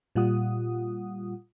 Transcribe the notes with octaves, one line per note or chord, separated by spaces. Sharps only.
A#2 G3 F4 F#5 D#6